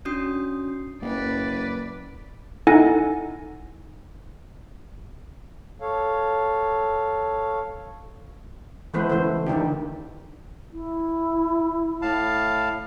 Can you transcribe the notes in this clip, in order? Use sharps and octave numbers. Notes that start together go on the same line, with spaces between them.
C#4 D4 F#4 D#6 G6 C7
F#1 B4 D5
D#4 E4 A4 F#5 G#5 A#6
A4 C#5 F5
E3 G#3 A3 B3 B4 C5
C#3 E3 A3 C5
D3 D#3 D4 G4
E4
A2 F5 A5